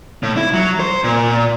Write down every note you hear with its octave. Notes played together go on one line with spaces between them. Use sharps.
A2
E4
F#3
C5
A#2